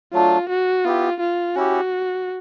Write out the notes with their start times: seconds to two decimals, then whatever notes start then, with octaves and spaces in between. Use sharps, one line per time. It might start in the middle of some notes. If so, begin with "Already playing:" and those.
0.13 F#3 A3 D4 F4
0.49 F#4
0.84 B3 E4 F4 G4
1.20 F4
1.55 C#4 E4 F#4 G4